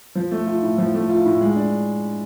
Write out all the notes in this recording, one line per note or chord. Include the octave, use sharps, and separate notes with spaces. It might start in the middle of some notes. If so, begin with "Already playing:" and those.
F3
A3
F4
A2
F3
A3
F4
A2
G#3
D4